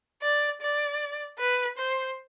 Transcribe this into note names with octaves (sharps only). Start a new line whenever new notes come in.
D5
D5
B4
C5